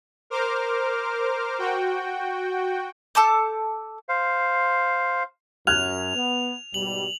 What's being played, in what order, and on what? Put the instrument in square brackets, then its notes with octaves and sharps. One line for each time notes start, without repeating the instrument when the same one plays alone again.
[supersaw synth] A#4 C5 D6 F6
F#4 G5
[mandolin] A4 A5 D6 G6
[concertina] C5 F5
[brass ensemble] F#2 [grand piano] F6 F#6 G#6 [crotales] F7
[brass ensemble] B3
[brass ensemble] G#2 B2 G3 [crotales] F#7